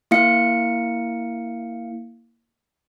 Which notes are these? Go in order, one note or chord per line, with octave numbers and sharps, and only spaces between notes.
A#3 E4 F5 C#7